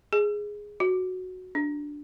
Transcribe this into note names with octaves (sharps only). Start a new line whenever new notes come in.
G#4
F#4
D4